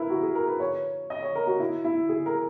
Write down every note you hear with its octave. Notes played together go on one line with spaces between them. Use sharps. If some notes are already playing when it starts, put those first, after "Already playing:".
Already playing: E4 A#4 B4
F#4
G#4
A#4
B4
C#5
D#5
C#5
A#4
F#4
E4
E4
G#4
A#4